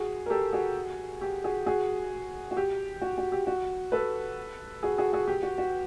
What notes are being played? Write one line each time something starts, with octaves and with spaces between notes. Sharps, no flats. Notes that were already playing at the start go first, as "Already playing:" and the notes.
Already playing: F#4 G#4
A#4
G4 A4
F#4 G#4
G4
F#4 G#4
F#4 G#4
F#4
G4
F#4
F#4
G4
F#4
A4 B4
F#4 G#4
F#4 G#4
F#4 G#4
G4
F#4
F#4